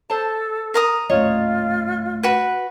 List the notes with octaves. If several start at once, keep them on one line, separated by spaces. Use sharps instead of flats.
A4 C5 A5
A#4 A#5 D#6
D#1 A2 F4 C#5 D#5
F#4 B4